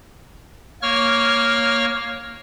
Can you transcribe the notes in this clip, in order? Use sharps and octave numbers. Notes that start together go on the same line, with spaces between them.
A#3 C#5 C#6 F6